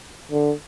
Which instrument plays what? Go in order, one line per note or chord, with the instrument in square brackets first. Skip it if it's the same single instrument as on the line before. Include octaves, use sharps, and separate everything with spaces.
[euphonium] D3